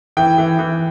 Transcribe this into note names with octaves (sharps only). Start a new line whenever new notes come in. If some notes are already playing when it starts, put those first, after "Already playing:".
E3 G5
E3
E3